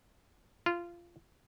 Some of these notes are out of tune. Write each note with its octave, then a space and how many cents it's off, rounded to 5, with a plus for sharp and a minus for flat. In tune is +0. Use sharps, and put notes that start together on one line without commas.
F4 -15